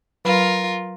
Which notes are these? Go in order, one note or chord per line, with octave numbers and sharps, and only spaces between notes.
F#3 F4 A#4 B4 B5